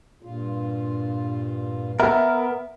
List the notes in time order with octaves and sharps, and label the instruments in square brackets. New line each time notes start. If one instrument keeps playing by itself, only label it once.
[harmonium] G2 A#2 F4
[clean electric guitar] B3 A#4 [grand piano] E5